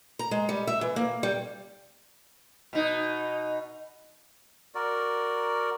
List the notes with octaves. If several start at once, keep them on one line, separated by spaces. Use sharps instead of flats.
A#5
G#3
G3
E5
E3
A#3
G3
B2 D#4
F#4 A#4 D5